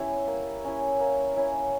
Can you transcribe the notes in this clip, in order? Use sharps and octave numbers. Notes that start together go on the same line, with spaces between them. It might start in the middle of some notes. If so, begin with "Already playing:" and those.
Already playing: B3 C#4 E4 G4
A#3
C#4 E4
A#3
C#4 E4